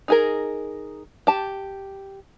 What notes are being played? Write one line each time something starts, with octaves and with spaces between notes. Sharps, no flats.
D#4 G#4 A#4
G4 A5